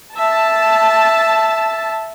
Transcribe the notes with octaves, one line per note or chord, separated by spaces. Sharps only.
E5 A5